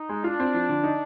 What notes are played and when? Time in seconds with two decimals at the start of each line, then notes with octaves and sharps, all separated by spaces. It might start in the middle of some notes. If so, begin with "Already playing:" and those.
Already playing: D#4
0.09 G#3
0.24 D4 F4
0.40 C4
0.54 F3
0.69 D3
0.83 D#4